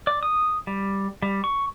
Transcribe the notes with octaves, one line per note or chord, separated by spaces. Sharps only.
D5
D#6
G3
G3
C#6